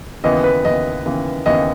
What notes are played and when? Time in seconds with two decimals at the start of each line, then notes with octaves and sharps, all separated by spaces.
0.24 D#2 C#3 E3 B3 D#5
0.44 B4
0.65 D#2 C#3 E3 B3 D#5
1.05 D#2 C#3 E3 B3
1.46 D#2 C#3 E3 B3 D#5